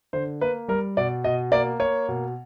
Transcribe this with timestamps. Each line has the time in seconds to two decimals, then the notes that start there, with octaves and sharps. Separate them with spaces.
0.13 D3 C5
0.41 A#3 B4
0.68 G3 A#4
0.97 B2 D5
1.24 B2 D#5
1.52 A#3 D5
1.79 A#3 C#5
2.08 B2